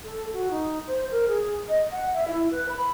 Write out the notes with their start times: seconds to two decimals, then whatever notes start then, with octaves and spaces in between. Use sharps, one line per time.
0.04 A4
0.33 F#4
0.51 D#4
0.87 C5
1.11 A#4
1.28 G#4
1.69 D#5
1.91 F#5
2.14 E5
2.28 E4
2.51 B4
2.69 B5